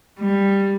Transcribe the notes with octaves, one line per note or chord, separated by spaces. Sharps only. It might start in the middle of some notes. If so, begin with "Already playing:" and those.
G3